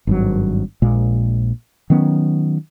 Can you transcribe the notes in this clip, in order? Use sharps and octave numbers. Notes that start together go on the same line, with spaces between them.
G#1 G2 F#3
A#1 A#2 G#3
D#3 F#3 B3 C#4